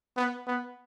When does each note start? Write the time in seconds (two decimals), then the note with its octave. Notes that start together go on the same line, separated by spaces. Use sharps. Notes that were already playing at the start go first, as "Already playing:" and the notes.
0.17 B3
0.47 B3